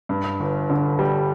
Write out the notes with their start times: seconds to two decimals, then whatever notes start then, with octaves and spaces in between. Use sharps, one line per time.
0.09 G2
0.40 G1
0.69 D3
0.99 G3